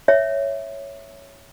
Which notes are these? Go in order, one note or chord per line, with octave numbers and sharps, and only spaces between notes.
C#5 E5